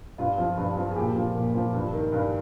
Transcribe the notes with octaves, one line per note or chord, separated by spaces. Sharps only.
G2 F4
F3
G2
F3
G#4
A#2 G4
F3
A#2
F3
G2
D#3
G2